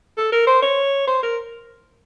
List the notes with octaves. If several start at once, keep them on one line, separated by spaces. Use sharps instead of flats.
A4
A#4
C5
C#5
C5
A#4